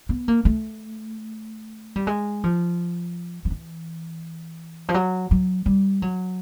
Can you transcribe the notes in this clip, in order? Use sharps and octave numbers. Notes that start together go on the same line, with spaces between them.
B3
A#3
A3
G3
G#3
F3
F3
E3
F3
F#3
F#3
G3
F#3